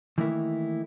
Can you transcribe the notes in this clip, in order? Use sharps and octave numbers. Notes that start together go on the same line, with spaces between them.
D#3 E3 A3 A#3 D#4 E4